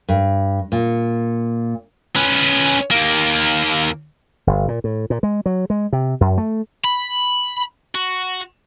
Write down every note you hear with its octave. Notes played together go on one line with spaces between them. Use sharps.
G2
A#2
C#4 B4
D#2 A#3
G1
A#2
A2
A#2
G#3
F#3
G#3
C3
F#2
A3
B5
F#4